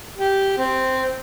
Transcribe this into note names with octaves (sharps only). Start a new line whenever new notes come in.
G4
C4